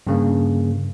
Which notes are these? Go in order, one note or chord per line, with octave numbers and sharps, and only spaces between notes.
G2 C#3 A#3